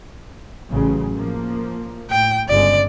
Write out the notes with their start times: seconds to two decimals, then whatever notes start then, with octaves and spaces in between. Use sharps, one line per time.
0.68 A1 C#3 F#3
1.16 F3 A#3
2.10 A2 G5
2.49 G1 C#3 G#3 D5